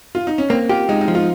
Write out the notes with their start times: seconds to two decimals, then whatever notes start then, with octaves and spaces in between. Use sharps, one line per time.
0.15 F4
0.27 D#4
0.38 C#4
0.50 A#3 C4
0.69 F4 G4
0.89 G#3 D#4
1.01 D#4
1.08 F3
1.15 F4